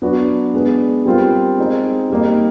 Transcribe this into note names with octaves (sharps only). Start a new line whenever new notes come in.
F#3 B3 D4 F#4
G#3 B3 D4
G3 C4 F4 A#4
G#3 C4 D#4
G3 A#3 D#4